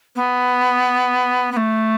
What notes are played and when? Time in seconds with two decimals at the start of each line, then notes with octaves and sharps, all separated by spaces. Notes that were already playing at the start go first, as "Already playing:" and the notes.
0.16 B3
1.52 B3
1.57 A3